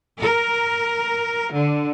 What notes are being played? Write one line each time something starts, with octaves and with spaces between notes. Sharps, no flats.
A#4
D3